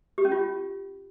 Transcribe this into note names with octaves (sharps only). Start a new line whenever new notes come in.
G4
C#4
F4